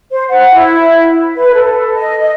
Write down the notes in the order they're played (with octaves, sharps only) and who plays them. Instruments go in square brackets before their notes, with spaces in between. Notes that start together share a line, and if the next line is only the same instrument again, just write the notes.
[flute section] C5
F#5
E4
B4
A4
D#5
D#5